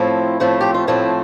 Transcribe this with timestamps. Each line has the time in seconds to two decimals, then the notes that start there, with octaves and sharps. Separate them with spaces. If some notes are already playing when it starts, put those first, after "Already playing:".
Already playing: A2 F3 A3 C4 E4
0.40 A2 F3 A3 C4
0.61 G4
0.74 F4
0.87 A2 F3 A3 C4 E4